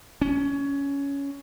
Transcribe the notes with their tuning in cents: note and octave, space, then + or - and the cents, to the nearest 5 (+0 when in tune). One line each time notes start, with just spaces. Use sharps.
C#4 +15